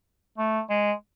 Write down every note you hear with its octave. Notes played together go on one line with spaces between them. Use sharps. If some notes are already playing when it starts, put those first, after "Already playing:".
A3
G#3